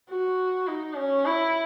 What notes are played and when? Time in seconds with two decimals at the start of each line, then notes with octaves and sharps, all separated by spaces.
0.10 F#4
0.67 D#4
0.96 C#4
1.25 E4